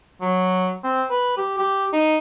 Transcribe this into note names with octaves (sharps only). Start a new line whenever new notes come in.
F#3
C4
B4
G4
G4
D#4